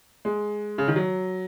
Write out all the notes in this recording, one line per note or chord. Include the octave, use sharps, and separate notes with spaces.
G#3
C#3
D#3
F#3